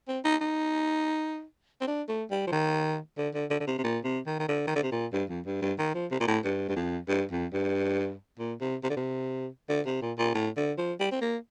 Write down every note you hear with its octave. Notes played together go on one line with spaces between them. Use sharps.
C4
D#4
D#4
C4
D4
A3
G3
F3
D#3
D3
D3
D3
D3
C3
C3
A#2
C3
D#3
D#3
D3
D#3
D3
C3
A#2
G2
F2
G2
G2
D#3
F3
C3
A#2
A2
G2
G2
F2
G2
F2
G2
A#2
C3
C3
D3
C3
D3
C3
A#2
A#2
A2
D3
F3
G3
C4
A#3